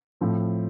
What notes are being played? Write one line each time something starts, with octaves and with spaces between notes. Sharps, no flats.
A2 F3 C4